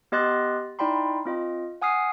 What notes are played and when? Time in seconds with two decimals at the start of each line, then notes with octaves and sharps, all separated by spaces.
0.12 B3 G4 D#5 C6 F#6 A6
0.79 D#4 E4 D5 G5 B5 C6
1.25 C4 F4 D#5
1.82 F#5 G#5 D#6 F6 C7